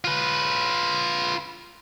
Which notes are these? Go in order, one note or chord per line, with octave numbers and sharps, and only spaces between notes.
F4 B4